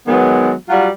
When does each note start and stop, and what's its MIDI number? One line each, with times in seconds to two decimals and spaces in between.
0.08 0.53 51
0.08 0.53 54
0.08 0.53 56
0.08 0.53 59
0.69 0.88 54
0.69 0.88 55
0.69 0.88 65
0.69 0.88 66